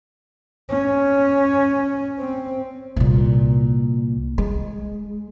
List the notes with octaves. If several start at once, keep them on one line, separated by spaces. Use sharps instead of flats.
C#4
C4
C2 A#2
G#3